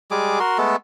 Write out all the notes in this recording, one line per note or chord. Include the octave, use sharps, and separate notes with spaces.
G3 G#3 G#4 D6
F#4 A#4 C6
G#3 A3 B3 A4